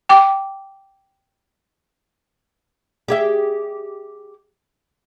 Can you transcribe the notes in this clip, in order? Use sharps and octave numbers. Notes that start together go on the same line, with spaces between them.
G5 D6
G4 G#4 E5